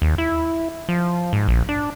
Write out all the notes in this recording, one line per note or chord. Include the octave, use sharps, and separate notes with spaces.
D#2
E4
F3
G#2
A#1
D4